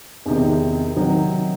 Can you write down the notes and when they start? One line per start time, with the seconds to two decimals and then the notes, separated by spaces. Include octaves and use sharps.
0.26 E2 C3 D#3
0.96 C3 D#3 F#3